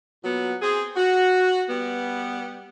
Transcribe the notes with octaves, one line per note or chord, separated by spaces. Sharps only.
A#2 F#3 B3
C4 G#4
F#4
G3 B3